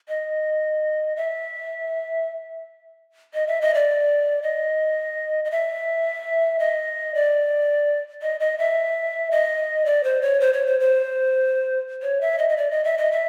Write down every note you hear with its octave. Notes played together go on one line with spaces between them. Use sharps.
D#5
E5
D#5
E5
D#5
D5
D#5
D#5
E5
D#5
D5
D#5
D#5
E5
D#5
D5
C5
C#5
C5
C#5
C5
C5
C#5
E5
D#5
D#5
D5
D#5
E5
D#5
E5